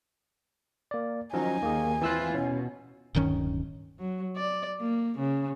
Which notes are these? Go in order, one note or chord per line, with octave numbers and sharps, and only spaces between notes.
A#3 D5
D#3 F3 F#3 C#4 D#4 G#5
D#2 A#3 G#4
E3 C4 E4 F4 E6 F#6
B2 C#4
D1 G2 D#3 C#4
F#3
D5
A#3
C#3